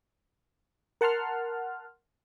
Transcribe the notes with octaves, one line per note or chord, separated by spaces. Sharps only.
A#4 F#5 A5 C6 F6